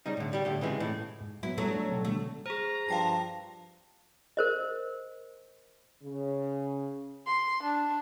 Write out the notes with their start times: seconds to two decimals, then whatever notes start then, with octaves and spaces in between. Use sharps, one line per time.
0.06 C#3 G3 D#4
0.17 A2 D3
0.33 G3 G4
0.45 A2 D3 G4
0.61 C#3 E3 G#3 C4 F4
0.80 A2
1.20 G#2
1.43 F#3 B3 E4
1.58 F#3 G3 A3 B3 E4
1.71 D4
1.89 B1 C3 A4
2.05 B2 D3 G3 A3
2.46 G#4 C5 A#5
2.89 G2 F3 F5 G5 A5 A#6
4.37 A#4 C5 D#5
6.03 C#3
7.26 C6
7.63 D4